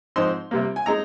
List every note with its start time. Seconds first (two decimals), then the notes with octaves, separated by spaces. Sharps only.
0.16 G#2 F3 C4 D#4 C6
0.51 C3 G3 A#3
0.76 G#5
0.86 G#3 D#4 A#5